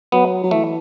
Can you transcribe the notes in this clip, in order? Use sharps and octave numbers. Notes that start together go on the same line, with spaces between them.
F#3 B3
F#3
E3 A3